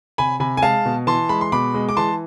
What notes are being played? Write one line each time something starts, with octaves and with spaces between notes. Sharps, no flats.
C3 G#5 B5
C3 G#5 B5
G#5
G#3 F5 A5
B2
E3 A5 C6
G#3 B5
C6
B2 B5 D6
G#3
D6
E3 A5 C6